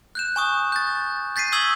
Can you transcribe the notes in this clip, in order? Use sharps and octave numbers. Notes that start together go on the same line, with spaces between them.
F#6 G6 E7
G#5 C#6 D#6
G6 A6
G6 A6 B6 C7 D#7
C#6 D#6 E6 G#6 F#7